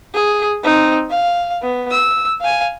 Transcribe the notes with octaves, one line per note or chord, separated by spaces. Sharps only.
G#4
C4 D#4
F5
B3
E6
F5 G#5